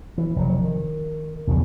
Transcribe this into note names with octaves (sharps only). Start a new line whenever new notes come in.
E3
F1 F#3
D#3
B1 E2 C#3 F3